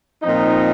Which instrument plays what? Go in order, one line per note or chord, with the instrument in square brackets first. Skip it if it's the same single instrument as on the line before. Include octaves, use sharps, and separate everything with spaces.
[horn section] A#2 F3 C4 D#4